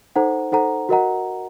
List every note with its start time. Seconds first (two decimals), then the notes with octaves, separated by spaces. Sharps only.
0.16 D#4 A4 C5 F#5 A#5
0.52 D#4 A4 C5 F#5 A#5
0.89 F#4 A#4 D#5 F#5 A#5